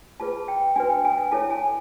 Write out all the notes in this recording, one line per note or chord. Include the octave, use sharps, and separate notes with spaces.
F4 G#4 B4 A5
G5
D4 F#4 B4 G#5
G5
G#5
G#5
E4 A4 C#5 A5
G#5